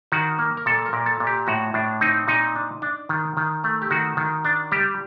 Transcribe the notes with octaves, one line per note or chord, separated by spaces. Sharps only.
D#3 F#4
A#3
A#4
A#2 A4
A#4
A#2
A4
A#2
G4
A2 F#4
A2 D4
C4 D#4
A#2 D#4
D4
D4
D#3
D#3
A3
G4
D#3 F#4
D#3
D4
G3 G4